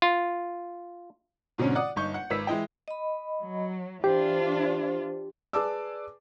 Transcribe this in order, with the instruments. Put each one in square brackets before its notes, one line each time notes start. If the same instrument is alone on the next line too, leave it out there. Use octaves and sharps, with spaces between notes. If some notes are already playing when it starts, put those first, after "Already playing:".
[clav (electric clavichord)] F4
[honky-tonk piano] G#2 B2 D3 C4 C#4
D5 F#5 D#6
G1 D#4 C#6 G6
F#5 C#7
G#1 B4 E6 B6
E3 G#3 E4 D#5 G5
[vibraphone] D#5 B5
[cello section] F#3
[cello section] E3 D4 F4 [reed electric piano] G4 [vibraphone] C5
[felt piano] G#4 B4 D5 A5 D6 E6